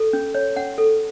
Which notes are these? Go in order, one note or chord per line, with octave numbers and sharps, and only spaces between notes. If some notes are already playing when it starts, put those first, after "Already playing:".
Already playing: A4
C#4
C#5
C#4 F#5
A4